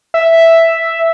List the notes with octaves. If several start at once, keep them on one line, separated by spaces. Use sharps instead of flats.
E5